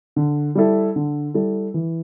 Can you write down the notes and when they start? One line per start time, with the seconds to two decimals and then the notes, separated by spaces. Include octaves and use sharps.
0.16 D3
0.55 G3 E4 A4
0.96 D3
1.34 G3 E4 A4
1.74 E3